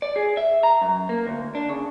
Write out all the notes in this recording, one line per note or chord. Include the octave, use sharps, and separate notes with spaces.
D5
G#4
E5
A#5
F#2
A#3
D2
D4
C#3